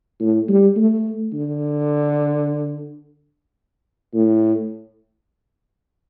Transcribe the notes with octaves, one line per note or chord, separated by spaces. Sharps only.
A2
G3
A3
D3
A2